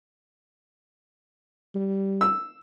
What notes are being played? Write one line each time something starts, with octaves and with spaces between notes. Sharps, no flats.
G3
E6